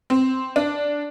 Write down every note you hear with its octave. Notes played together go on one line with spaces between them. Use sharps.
C4
D4